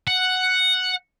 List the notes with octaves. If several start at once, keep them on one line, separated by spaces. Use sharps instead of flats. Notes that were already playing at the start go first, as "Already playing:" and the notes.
F#5